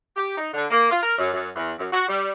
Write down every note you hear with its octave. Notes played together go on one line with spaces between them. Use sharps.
G4
D#4
D3
A#3
F4
A#4
F#2
F#2
E2
F#2
F#4
G3